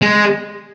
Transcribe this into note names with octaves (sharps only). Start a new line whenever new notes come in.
G#3